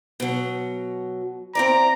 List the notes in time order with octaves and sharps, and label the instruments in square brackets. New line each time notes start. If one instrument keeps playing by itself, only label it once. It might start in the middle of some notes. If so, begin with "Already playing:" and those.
[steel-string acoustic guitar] B2 F#3
[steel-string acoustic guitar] C4 E4 D5 [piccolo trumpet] A#5